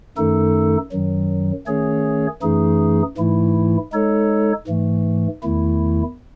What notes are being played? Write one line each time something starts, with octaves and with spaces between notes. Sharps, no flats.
F#2 D#3 A3 D#4 A4
F#2 D#3 F#3
D#3 A3 C#4 G#4 C#5
F#2 E3 A3 D#4 G#4
G#2 E3 A3 E4
G#3 D#4 A4 C#5
G#2 E3 A3
E2 D#3 A3 E4